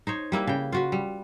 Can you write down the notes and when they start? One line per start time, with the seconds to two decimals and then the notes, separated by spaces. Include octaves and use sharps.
0.07 D#4 C5 C#5
0.32 G3 A#3 E4 B4
0.47 C#3 G5
0.72 F4 F#4 B4
0.92 G3